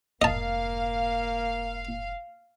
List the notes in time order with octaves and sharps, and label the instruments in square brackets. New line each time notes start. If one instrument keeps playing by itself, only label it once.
[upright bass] F1 G#2 [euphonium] A#3 [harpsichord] D#5 A5 [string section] F5